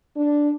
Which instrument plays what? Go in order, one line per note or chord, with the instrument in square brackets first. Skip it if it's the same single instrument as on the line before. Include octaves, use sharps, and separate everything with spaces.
[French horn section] D4